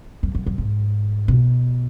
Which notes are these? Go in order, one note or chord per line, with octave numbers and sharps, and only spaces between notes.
F#2
F#2
F#2
G#2
B2